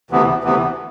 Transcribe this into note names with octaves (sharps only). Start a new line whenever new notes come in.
D2 C3 E3 B3
D2 C3 E3 B3